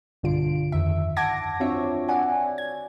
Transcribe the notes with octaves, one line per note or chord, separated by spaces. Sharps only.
B1 G2 D3 F4 D7
F2 D#3 E5
F#5 A5 D6 G#6 A#6
C4 D4 F4 F#4 C#5 E5
D5 F#5 G#5
G#6